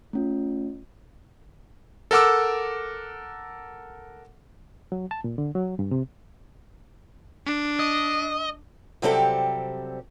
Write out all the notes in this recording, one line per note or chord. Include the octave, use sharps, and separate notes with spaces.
A3 C#4 F4
A4 A#4 F#5 D6 E6
F#3
A5
A#2
D3
F#3
G2
C3
D4
D#5
C3 F#3 G3 C4 G4 A4